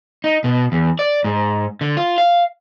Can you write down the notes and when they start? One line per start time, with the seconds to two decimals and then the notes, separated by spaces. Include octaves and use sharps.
0.24 D#4
0.44 B2
0.72 E2
0.99 D5
1.24 G#2
1.81 D3
1.97 F4
2.18 F5